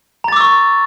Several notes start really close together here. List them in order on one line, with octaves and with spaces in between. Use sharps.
A#5 A6 D6 E6 C#6